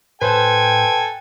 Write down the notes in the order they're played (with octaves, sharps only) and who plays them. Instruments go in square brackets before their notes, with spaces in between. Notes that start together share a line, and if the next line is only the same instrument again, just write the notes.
[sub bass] A2 [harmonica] A4 G#5 [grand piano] B4 C5 [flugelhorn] G5